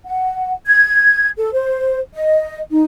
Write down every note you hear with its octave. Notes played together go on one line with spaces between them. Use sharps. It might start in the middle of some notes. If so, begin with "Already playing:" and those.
F#5
G#6
A4
C5
D#5
D#4